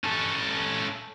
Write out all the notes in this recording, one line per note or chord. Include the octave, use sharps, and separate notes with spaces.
C#4 A4